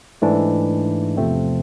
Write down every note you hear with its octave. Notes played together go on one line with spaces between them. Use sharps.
G#2 E3 A3 D4
E2 C3 F3 A3 C4